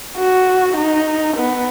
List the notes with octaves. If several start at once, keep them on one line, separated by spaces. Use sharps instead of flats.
F#4
D#4
B3